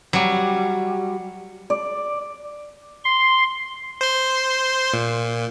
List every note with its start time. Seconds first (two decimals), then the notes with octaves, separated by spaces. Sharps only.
0.13 F#3 G3
1.70 D5
3.05 C6
4.01 C5 C6
4.93 A#2